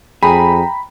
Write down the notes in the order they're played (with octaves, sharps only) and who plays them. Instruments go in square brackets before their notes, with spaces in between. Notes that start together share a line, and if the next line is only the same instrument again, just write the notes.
[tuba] F2 [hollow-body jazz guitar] G#4 [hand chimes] G5 A#5 [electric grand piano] B5